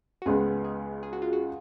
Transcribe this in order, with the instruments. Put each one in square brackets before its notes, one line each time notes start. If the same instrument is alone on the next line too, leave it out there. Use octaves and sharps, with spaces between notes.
[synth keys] F#4
[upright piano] C#2 C#3 G#3 B3 [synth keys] G#4
[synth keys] G#4
G#4
F#4
F4
F#4